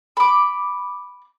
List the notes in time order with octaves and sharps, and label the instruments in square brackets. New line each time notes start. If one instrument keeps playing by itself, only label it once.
[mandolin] B5 D6